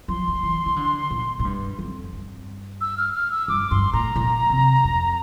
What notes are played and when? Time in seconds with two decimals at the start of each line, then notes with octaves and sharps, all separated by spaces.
0.08 F3 C6
0.28 F3
0.43 E3
0.66 E3
0.76 D3
1.11 A#2
1.39 A2
1.45 G2
1.79 F2
2.13 G2
2.81 E6
2.97 F6
3.14 F6
3.32 E6
3.48 G2 D6
3.71 G2 C6
3.93 A2 A#5
4.16 A#2
4.50 C3
4.84 F2